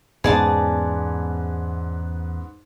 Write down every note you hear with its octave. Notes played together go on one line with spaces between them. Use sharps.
E2 G#2 B3 C#4 G#4 D5 A5